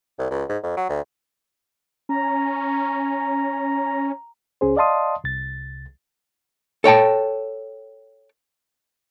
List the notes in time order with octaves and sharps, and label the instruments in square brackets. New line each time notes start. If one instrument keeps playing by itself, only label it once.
[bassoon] C2
C#2
G#2
F2
F#3
D2
[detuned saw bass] C#4 [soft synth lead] A#5
[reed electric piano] C#2 C#4 G#4 C5
D5 D#5 F5 A5 C6 D#6
C2 A6
[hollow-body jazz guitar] A4 C#5 G5 A5